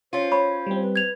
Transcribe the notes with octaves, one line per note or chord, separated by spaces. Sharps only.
C#4 F4 C5
C#5 B5
G3 C4
B4
G#6 F7